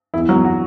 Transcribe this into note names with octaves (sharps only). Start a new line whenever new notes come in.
E2 E4
F#3
E2
F#4